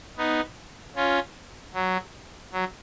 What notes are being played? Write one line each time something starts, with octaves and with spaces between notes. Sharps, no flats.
B3 D#4
C#4 F4
F#3
F#3